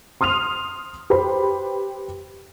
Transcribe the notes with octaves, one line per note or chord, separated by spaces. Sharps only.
C6 D#6 F6 D#7 F7
G4 B4 C5 B5